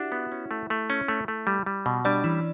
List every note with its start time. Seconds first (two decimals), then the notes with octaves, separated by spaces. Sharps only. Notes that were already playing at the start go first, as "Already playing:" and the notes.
Already playing: D4 E4 F#4 G4 E5 F#5
0.12 B3
0.32 C#4
0.51 A3
0.70 A3
0.90 C#4
1.08 A3
1.28 A3
1.47 G3
1.66 G3
1.86 B2
2.05 G3 D4 D5
2.24 E3 C#4 E4